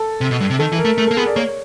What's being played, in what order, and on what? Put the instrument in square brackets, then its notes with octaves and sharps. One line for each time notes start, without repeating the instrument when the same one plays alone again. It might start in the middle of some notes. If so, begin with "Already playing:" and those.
Already playing: [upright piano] A4
[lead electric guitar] C3
B2
G2
C3
[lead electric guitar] D#3 [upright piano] A4
[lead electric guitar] E3
[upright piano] A#4
[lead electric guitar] A3
[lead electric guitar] A3 [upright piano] A#4
[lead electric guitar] A#3 [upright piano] A4
[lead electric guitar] B3 [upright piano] G#4
[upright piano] D5
[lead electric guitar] A#3 [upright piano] C#5